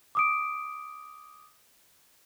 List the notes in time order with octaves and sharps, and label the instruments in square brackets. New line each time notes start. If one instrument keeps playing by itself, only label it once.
[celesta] D6 D#6 D7